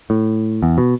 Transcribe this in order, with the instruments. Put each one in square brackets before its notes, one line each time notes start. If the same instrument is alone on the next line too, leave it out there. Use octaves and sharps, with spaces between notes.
[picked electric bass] A2
E2
B2